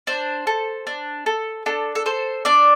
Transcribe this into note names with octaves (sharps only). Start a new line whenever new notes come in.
D4 C5
A4
D4
A4
D4 A4
A4
A4 C5
D4 D5